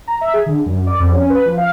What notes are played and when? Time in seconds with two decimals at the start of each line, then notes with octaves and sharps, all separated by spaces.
0.07 A#5
0.21 E5
0.34 G#4
0.46 D3
0.66 F#2
0.87 D5
1.00 F2
1.12 C#4
1.30 B4
1.46 F3
1.57 F5